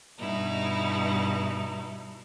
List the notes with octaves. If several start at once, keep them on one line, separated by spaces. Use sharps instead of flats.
G2 B2 D#4 E4